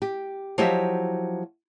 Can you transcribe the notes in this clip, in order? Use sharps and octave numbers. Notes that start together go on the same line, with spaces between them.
G4
F3 F#3 E4 G4 D#5 E5